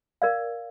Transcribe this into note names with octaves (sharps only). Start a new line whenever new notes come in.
A#4 D5 F5